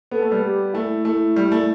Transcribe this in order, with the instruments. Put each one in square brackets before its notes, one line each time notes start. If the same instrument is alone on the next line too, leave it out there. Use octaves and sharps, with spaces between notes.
[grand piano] B3 [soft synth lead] A4
[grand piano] A3
G3 B3
[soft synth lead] G4
[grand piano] A3 [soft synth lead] E4
[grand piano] A3
G3
A3